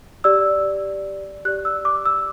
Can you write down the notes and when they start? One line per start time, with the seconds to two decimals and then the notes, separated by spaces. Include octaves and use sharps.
0.24 G4 D5 E6
1.45 G4 F#6
1.48 D5
1.65 E6
1.85 D6
2.06 E6